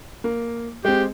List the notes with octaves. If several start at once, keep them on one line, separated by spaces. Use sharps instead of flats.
A#3
G#3 C4 G4